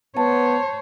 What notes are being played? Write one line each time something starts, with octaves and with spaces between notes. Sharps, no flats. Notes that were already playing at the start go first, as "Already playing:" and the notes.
B3 C5 C#5 A5